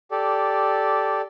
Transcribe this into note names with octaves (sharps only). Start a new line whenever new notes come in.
G4 A4 D5